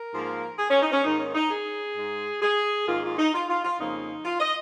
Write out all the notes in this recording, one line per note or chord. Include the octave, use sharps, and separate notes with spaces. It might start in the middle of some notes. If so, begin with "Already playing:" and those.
Already playing: A#4
G#2 F3 A#3
G#4
C#4
D#4
C#4
G#2 D#3 A#3 D#4
C#4
D#4
G#4
G#2 G#3
G#4
G#2 D#3 A#3 F4
F4
D#4
F4
F4
F4
F2 C#3 F3 A#3 D#4
F4
D#5